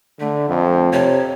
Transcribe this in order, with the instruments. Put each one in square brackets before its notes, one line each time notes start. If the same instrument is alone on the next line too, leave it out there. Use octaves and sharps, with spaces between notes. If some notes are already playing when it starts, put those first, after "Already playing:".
[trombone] D3 [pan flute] A3
[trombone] F2
[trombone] C3 [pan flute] C#5